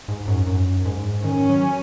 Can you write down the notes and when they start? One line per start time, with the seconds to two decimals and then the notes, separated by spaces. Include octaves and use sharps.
0.08 G#2
0.28 F#2
0.47 F#2
0.85 G#2
1.24 D#3 C#4
1.50 F#3